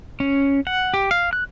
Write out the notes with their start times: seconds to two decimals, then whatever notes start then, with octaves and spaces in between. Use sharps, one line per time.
0.20 C#4
0.67 F#5
0.94 G4
1.11 F5
1.33 F#6